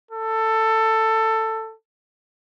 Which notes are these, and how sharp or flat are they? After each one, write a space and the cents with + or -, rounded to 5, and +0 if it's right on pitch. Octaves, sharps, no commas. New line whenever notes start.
A4 +15